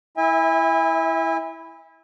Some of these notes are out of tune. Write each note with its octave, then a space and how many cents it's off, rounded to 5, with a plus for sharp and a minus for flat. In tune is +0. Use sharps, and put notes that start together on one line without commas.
E4 +0 E5 -25 G#5 -35